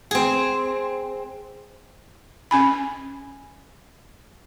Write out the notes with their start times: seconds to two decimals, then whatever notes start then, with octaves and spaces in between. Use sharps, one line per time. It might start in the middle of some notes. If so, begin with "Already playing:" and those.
0.11 C4 G#4
2.51 C#4 G#5 B5